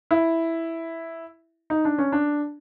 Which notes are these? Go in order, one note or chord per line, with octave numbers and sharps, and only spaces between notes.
E4
D#4
D4
C#4
D4